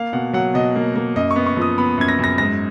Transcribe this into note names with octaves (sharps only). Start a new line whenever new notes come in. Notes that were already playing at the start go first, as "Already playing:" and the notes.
Already playing: A#3 F5
B2 F#5
F#3 F#5
B2 D#5
A#3
A#3
F#2 D#5
C#6
B3
C#6
F3 D#6
B3 B5
F#2 G#6
A#6
F#2 A#6
G#2 A#6